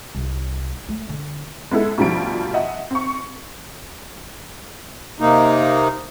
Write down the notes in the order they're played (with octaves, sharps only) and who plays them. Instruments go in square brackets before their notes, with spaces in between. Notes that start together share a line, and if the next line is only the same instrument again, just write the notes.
[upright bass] C2
A3
D3
[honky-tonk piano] G#3 B3 E4 A4
D2 B2 F3 G3 D7
D#5 E5 F#5
C4 C#6
[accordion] C3 A#3 D#4